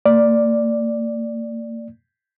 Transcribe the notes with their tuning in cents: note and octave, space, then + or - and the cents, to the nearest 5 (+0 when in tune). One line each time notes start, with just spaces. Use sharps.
A#3 -35 D5 +0